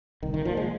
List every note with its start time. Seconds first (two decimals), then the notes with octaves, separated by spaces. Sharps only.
0.23 C2 D#3
0.34 D#3
0.45 A#2 F3
0.57 G#3